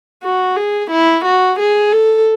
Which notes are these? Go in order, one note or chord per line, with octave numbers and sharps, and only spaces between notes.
F#4
G#4
E4
F#4
G#4
A4